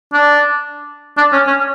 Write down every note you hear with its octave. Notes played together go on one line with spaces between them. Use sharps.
D4
D4
C#4
C#4